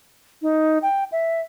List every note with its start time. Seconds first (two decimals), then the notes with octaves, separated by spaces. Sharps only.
0.42 D#4
0.82 G5
1.12 E5